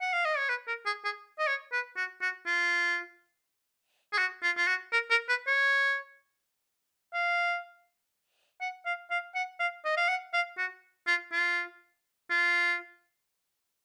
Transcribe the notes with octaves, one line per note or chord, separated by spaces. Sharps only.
F#5
F5
D#5
C#5
B4
A#4
G#4
G#4
D#5
C#5
B4
F#4
F#4
F4
G#4
F#4
F4
F4
F#4
A#4
A#4
B4
C#5
F5
F#5
F5
F5
F#5
F5
D#5
F5
F#5
F5
F#4
F4
F4
F4